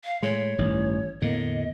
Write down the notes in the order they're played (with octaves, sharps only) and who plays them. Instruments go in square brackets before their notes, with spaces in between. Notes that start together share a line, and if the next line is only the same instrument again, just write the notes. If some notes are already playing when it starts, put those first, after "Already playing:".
[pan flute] F5
[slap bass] A2 [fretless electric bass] G#3 [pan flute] C#5
[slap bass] A1 [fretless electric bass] G2 D#3 E3
[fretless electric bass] E2 A#3 B3 [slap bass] A2 D3 [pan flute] D#5